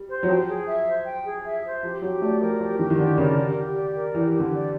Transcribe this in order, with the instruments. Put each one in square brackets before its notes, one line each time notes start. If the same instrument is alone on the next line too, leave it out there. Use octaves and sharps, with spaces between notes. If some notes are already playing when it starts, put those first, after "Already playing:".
Already playing: [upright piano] G3
[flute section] C5
[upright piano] F#3
[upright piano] F3 [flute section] G5
[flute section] G#4
E5
C5
G5
G#4
E5
C5
[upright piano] F3 [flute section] G4
[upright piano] F#3 [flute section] G4
[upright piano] A3 [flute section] D5
[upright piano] F3 [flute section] A#4
[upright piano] F3 [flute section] G4
[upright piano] D#3 [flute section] G4
[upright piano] D#3
[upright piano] D3 [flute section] D5
[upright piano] C#3 [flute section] A#4
[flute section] G4
G4
D5
A#4
[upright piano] E3 [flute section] G4
[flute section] G4
[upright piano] D3
[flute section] D5